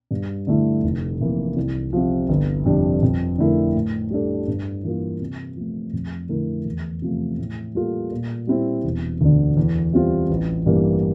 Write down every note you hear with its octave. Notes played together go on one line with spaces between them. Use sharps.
G2
D3 A3 E4
F1
F2 E3 A#3
C2
C3 F3
G1
F2 C3 G3 D4
F2
D3 A3 E4 A#4
A2
G3 D4 A4
G2
E3 A#3 F4
C3
F3 A3
F2
D3 A3 E4 A#4
E2
C3 F3 A3
A2
G3 A#3 F4 A4
A#2
G3 C4 E4
E1
D2 D3
E2
E3 G3 C4 F4
A1
G2 E3 G3 A#3